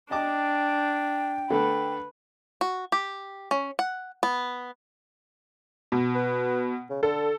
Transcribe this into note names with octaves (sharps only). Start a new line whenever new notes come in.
D4 D#5 G5 A5 D6
D3 A3 A4 B4
F#4
G4
C#4
F#5
B3
B2
B4
C#3
D3 A4